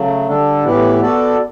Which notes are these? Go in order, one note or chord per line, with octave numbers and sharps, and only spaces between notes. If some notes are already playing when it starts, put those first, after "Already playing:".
Already playing: C#3 F#3 A3
D3 G3 D4 A4
A2 E3 B3 E4 G4
B3 F#4 A4 D5